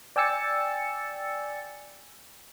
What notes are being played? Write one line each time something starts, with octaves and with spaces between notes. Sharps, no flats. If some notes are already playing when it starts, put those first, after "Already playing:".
D5 G5 G#5 E6 A6 C#7